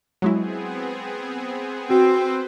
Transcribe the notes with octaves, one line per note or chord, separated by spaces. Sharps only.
F#3 G#3 B3 C4 E4 G#4
C4 F#4 B4 C5